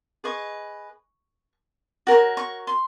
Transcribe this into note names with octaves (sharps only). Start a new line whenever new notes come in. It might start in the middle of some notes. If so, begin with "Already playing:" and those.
G#4 B4 D#5 C#6
F#4 A#4 C#5
C#6
C6